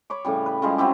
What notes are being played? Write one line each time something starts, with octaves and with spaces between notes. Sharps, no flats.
C#5 B5 D6
A2 C#3 G3
B4
C#3 F3 G3 G#3
F#3 C4 E4 G4